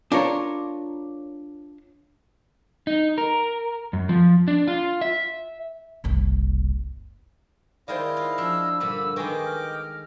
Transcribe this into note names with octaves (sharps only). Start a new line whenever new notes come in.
D4 F4 A#4 C#5
D#4
A#4
F#2
F3
D4
F4
E5
F#1 C2
D#3 G#3 E4 C5 D5 D#5 F5 G5
F4
F3 D4 E6
G2 A#2 D3 A4 B5
D#3 G#3 B4 D#5 G5 G#5 C#6 D6
F6 A#6